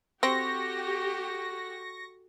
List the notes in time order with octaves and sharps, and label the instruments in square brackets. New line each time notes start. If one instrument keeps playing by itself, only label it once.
[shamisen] C4 [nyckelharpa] F#4 A4 [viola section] G4 [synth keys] C#6 A#6